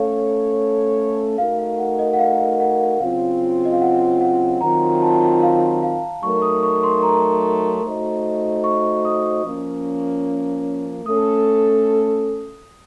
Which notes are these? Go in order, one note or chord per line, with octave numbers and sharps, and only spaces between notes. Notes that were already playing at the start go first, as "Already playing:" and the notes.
Already playing: A3 C#4 A4 C#5 F5
A3 D#4 F#4 A#4 F5
F5
F#5
D#5
F#5
F5
F5
F#5
F5
C#3 F#3 C4 F4 F5
D#5
F5
F#5
F#5
D#3 F#3 C4 F4 A#5
A5
F5
F5
F#3 A3 D#4 A#4 C#6
D#6
C#6
C6
A#5
A3 D#4 F#4 C5 D#5
C#6
D#6
F3 A#3 C#4
A3 C#4 A4 D#6